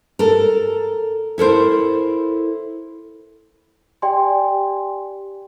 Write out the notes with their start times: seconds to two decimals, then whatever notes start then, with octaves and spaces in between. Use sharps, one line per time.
0.19 A4 A#4
1.38 E4 A4 A#4 C5
4.02 G4 D5 G5 G#5 C6